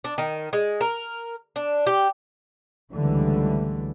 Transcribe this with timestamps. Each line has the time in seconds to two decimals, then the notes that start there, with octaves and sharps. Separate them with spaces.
0.04 D4
0.18 D#3
0.53 G#3
0.81 A#4
1.56 D4
1.87 G4
2.92 C#2 D3 E3 G3 A3